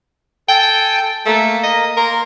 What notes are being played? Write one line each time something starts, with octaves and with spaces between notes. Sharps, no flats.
A4 G5 G#5
A3 A#3
D#5
A#3 A#4 C6